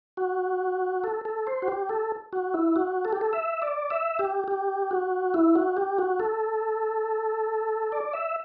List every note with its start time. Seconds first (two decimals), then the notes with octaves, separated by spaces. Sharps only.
0.17 F#4
1.04 A4
1.25 A4
1.47 C5
1.62 F#4
1.68 G4
1.89 A4
2.33 F#4
2.54 E4
2.76 F#4
3.05 A4
3.13 G4
3.21 A4
3.33 E5
3.62 D5
3.90 E5
4.19 G4
4.48 G4
4.91 F#4
5.34 E4
5.55 F#4
5.77 G4
5.98 F#4
6.20 A4
7.92 D5
8.13 E5